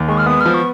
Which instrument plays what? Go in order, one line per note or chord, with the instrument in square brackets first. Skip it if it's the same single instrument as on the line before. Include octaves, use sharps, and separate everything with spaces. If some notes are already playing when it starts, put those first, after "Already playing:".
Already playing: [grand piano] D#2
[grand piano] G#3 [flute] C#6
[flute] F6
[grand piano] B3 [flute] D#6
[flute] F6
[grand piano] F3
[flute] C#6